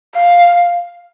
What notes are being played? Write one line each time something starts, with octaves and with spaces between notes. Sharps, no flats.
F5